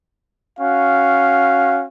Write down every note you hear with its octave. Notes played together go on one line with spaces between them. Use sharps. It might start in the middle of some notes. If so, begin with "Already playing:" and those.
C#4 F#4 F5